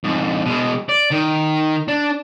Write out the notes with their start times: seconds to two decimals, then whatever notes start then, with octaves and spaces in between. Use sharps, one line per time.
0.04 F2 G#2
0.45 B2 G#3
0.89 D5
1.11 D#3
1.88 D4